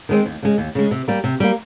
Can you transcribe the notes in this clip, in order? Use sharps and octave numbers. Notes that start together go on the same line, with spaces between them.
D#3 G#3 C4
D#2
C#3 G#3
D#2
C#3 G#3
C3
G3 A#3
C3
G3 A#3